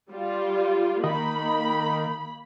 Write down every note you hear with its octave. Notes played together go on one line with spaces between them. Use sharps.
G3 F4
D#3 A#3 B5